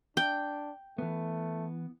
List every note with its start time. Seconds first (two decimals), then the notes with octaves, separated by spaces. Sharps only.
0.17 D4 G5
0.98 E3 A3 B3